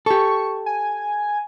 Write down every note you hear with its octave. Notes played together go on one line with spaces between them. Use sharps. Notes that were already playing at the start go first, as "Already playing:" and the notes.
G4 A4 C#6
G#5